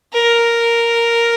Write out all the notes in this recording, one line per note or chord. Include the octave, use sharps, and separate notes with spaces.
A#4